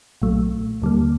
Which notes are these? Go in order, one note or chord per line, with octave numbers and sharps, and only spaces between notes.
B1 A#2 F#3 A3
D#2 D3 G3 A#3